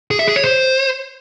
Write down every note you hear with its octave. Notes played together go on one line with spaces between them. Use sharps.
G#4
E5
G#4
C#5
C5